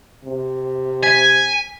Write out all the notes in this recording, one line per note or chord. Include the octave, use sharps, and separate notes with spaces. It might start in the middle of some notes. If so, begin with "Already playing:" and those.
C3
G#5 B6